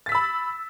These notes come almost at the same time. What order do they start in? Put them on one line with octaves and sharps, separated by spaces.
A6 B6 E6 B5